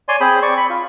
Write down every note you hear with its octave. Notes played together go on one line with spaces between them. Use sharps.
C#5 D5 G#5 C6
C4 G#4 C5 B5
D5 C#6
B5
F4